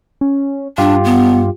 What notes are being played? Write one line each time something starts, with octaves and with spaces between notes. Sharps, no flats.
C#4
G2 D4 F4 G4
B3